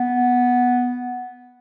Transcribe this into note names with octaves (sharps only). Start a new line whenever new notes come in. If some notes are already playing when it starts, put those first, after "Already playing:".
Already playing: B3